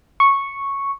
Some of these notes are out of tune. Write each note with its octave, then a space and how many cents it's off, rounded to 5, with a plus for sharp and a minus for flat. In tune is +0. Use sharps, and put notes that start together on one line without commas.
C#6 -5